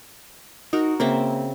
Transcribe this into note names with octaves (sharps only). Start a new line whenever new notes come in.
D#4 F#4 A#4
C#3 A#3 C4 E5